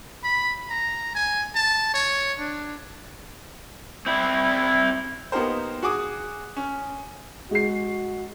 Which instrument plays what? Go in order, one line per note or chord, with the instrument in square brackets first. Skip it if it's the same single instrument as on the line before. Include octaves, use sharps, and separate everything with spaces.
[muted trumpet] B5
A#5
G#5
A5
C#5
D4
[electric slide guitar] C4 E4
[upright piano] A#3 B3 D#4 G4 A#4 C5
F#4 G#4 D6 D#6
C#4
[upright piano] G#3 C7 [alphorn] F#4